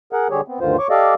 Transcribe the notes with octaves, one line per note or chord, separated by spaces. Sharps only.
G#4 A#4 F#5
D3 G3 G4 G#4 C#5
B3 C4
D2 G2 D3 D#3 F4 C5
C#5 C#6 D6
G4 A4 D5 D#5 F5